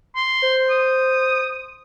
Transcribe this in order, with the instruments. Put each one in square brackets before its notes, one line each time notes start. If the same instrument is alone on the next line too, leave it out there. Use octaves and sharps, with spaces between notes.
[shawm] C6
[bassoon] C5
[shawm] D#6